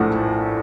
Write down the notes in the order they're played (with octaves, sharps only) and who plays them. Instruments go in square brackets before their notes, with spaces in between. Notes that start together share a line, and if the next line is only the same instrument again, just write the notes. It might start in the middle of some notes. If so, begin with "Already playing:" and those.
Already playing: [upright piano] A#1 A2 F3 A3 F#5